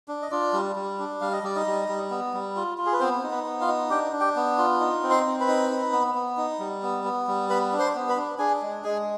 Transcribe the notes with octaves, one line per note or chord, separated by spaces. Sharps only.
D4
D#5
D4 F4 D5
G3
G3
D4
G3 F5
D#5
G3 D5
D#4 D#5
G3
G3
B3
G3
F4
F4
G#4
B4
B3 C4 C5
D#4
B3 B4
B3
F4 F5
D#4
D4 G4 G5
D4
G4 G5
B3
F4
D#4
C4
C5 C6
C4
B4 B5
D#4
D#4
B3
B3
D#4
G3
B3
B3
G3
B3 B4 B5
D4
C5 C6
B3
B4 B5
D4
D4 G#4 G#5
G#3
G#3 G#4 G#5